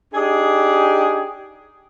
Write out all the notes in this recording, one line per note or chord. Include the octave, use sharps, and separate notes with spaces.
D4 D#4 G4 G#4